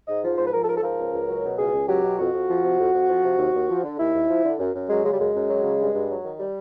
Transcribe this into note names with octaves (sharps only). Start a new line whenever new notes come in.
G#2 D#5
F3
G#2 C5
B4
F3 A#4
A4
G#2 A#4
A4
F3 A#4
C#2
C#2
F#3
B2
C#2 G#4
C#2
F#3 G4
B2
F2 F#4
F2
F3
C3
F2
F2
F3
C3
D#2
D#2
F3
D3
D#2 E4
D#2
F3
D3
F#2
F#2
F#3 G#3
C#3 G#3
G3
F#2 G#3
F#2
F#3
C#3
G2
G2
F#3
D#3
G3